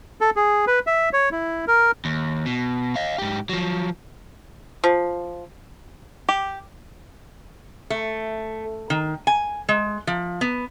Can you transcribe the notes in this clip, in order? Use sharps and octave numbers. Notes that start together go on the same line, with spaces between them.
A4
G#4
B4
E5
C#5
E4
A#4
D#2
B2
D#5 F5
G#2 G4
F3 F#3
F3
G4
A3
D#3
G#5
G#3
F3
B3